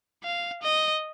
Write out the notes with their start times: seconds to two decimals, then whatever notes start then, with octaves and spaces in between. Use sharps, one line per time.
0.23 F5
0.63 D#5